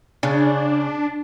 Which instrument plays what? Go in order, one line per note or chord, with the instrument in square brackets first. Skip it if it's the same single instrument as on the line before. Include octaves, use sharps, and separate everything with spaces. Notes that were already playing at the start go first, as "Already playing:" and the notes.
[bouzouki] C#3 [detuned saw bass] D4